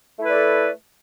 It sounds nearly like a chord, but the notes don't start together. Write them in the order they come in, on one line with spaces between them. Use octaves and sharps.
A3 E4 B4 D5 A4